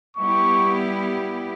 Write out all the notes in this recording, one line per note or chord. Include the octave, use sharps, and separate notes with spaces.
G3 B3 E4 G4 C#6